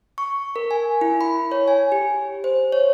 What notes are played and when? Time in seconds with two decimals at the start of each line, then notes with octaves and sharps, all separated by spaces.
0.18 C#6
0.56 A#4
0.71 G#5
1.01 E4
1.21 B5
1.52 C#5
1.68 G#5
1.92 G4
2.44 C5
2.72 C#5